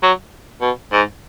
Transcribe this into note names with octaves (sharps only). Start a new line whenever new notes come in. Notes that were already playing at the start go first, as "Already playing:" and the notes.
F#3
B2
G#2